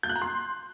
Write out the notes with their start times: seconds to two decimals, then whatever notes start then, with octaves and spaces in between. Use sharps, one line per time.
0.03 G6
0.09 F#6
0.16 A#5
0.22 C6